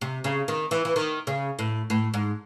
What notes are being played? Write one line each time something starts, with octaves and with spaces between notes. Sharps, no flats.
C3
C#3
D#3
E3
E3
D#3
C#3
A2
A2
G#2